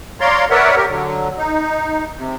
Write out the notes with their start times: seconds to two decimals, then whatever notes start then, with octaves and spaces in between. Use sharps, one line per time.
0.20 C#5 D5 F5 A#5 C6
0.50 A#4 B4 C#5 D5 E5 F#5
0.76 G4 A#4
0.88 D3 F#3
1.37 D#4
2.17 C3